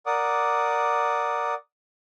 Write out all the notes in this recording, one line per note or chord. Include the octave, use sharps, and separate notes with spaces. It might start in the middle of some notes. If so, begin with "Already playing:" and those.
A#4 D5 F#5 D6 D#6